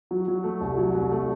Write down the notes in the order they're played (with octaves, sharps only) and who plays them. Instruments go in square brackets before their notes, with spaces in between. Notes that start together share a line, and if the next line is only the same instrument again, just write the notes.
[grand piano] F#3
F#3
A3
C2
F#3
C2
A3